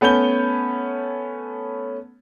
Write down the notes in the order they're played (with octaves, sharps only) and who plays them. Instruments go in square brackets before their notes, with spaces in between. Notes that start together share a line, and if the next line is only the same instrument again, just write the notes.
[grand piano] A3 B3 C#4 C#5 G6 G7